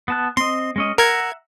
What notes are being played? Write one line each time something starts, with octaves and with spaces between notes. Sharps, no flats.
B3 A5 F#6
C4 D#5 C6
G#3 C#4 D#5
A#4 E5 F#5 A#5 G#6